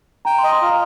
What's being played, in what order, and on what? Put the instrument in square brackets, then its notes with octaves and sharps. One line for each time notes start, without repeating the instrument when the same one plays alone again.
[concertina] G5 [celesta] A#5
[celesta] C6
[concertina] D#5
[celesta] C6
[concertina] F4 [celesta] A#5